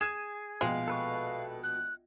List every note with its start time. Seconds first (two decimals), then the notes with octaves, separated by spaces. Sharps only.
0.01 G#4 G#6 D#7 E7
0.61 A#1 B2 G#3 F5 G5
0.88 A4 B4 C#6
1.63 F#6